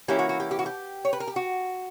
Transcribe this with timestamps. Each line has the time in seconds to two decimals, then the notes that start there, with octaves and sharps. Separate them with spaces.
0.08 E3 A#3 C#4 E4 G4
0.19 F#4
0.29 F#4
0.40 G4
0.51 G4
0.59 F#4
0.66 G4
1.05 C#5
1.13 B4
1.20 A#4
1.28 G4
1.36 F#4